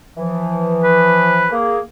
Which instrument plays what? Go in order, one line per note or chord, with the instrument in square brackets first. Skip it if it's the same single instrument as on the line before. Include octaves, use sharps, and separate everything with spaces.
[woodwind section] E3 F3
[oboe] B4
[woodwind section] A#3 G#4